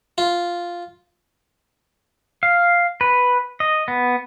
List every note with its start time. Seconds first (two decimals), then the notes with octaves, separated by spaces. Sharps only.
0.18 F4
2.43 F5
3.01 B4
3.60 D#5
3.88 B3